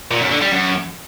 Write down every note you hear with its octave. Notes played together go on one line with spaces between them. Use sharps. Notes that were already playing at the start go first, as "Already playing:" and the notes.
A#2
F#2
D3
G3
F#2